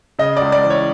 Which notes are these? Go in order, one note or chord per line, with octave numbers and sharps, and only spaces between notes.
C#3 D#5
D5
C#2
D5
E3
C#5